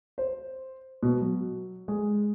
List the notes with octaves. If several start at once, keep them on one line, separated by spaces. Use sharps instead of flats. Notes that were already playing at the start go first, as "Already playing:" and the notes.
C5
B2
F#3
G#3